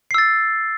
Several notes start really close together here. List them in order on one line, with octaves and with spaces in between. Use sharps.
C7 E6 A6